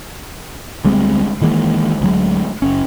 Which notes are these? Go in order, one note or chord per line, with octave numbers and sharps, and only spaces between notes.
D2 G3 G#3 C4
D#3 E3 G#3 A#3
D2 F#3 G#3
F#1 C#4